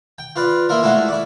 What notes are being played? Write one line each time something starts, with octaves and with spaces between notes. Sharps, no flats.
G5
F4 B4 D5
A#3 E4 F4 A#4
G#3 A3 D4 E4 F#4 F5
E4 D5